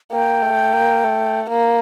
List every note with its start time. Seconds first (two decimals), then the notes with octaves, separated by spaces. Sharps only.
0.12 A#3 G5
0.42 A3
0.73 A#3
1.04 A3
1.50 A#3